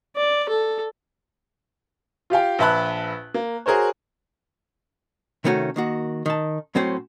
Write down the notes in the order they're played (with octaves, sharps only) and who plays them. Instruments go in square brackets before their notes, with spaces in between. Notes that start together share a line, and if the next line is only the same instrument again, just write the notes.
[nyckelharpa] D5
A4
[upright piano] F4 G4 F5 G5
A#1 B4 E5 A5 B5 F#6
A#3
F#4 G#4 A#4 C5 C#5
[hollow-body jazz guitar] C3 D#3 A3 C#4 F4 F#4
D#3 A#3 F#4
D#3 A5
A2 F#3 C4 C#4 C5 G5